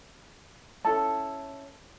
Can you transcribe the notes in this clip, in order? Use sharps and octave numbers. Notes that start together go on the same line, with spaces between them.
C#4 E4 A4 A5